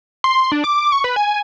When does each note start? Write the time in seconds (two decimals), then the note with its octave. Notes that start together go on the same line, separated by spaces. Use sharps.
0.24 C6
0.52 D4
0.64 D6
0.92 C#6
1.04 B4
1.16 G#5